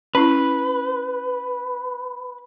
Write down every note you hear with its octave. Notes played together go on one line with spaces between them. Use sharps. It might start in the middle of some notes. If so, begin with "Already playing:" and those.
C#4 E4 B4